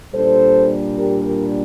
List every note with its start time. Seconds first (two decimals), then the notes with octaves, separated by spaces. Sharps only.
0.13 A#2 G3 D4 A4 C5
0.98 G4 A#4
1.26 G4 A#4